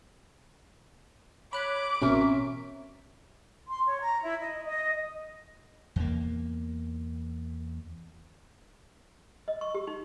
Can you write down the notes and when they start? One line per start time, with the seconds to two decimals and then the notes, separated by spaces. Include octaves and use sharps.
1.53 C#5 B5 D6 F#6
2.02 A1 B2 C4 C#4 A#4 E5
3.68 C6
3.86 C#5
4.02 A#5
4.23 E4
4.41 D#5
4.64 D#5
5.96 E2 A#3
9.48 D#5
9.61 C#6
9.74 G4
9.87 D#4